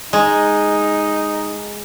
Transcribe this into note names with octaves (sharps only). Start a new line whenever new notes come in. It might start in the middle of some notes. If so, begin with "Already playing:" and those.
G#3 D#4